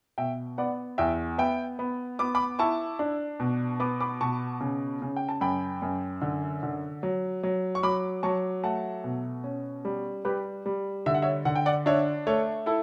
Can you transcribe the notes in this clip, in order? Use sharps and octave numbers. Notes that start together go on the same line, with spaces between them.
B2 E5 G5
B3 D5 F#5
E2 E5 G5
B3 E5 G5
B3
B3 D6
B5 D6
E4 A5 C#6
D4
B2
B3 D6
B5 D6
B2 A5 C#6
C#3
C#3
G5
A5
F#2 G5 B5
F#2
D3
D3
F#3
F#3
C#6
F#3 B5 D6
F#3 A5 C#6
A3 F#5 A5
B2
C#4
G3
G3 G4 B4
G3
D3 E5
F#5
C#5 E5
D3 F#5
G5
D5 F#5
D4 C#5 E5
A3 A4 C#5
E4 A4